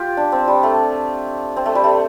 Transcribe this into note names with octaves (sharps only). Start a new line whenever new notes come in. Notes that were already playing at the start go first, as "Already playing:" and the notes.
Already playing: F4 G4
D4
C4
G3
A3
C4
A3
G3
A3